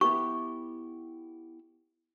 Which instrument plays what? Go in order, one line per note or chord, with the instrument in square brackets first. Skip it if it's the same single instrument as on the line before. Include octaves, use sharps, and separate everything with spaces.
[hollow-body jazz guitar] B3 E4 G4 [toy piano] C#6